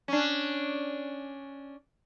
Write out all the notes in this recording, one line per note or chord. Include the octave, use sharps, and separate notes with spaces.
C#4 D4